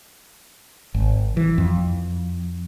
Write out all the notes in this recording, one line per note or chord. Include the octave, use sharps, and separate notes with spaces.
G#1
E3
F2